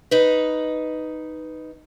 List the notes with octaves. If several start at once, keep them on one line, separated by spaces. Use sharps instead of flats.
D#4 B4